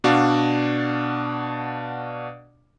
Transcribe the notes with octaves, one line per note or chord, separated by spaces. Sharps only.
B2 D4 F#4 D5 F5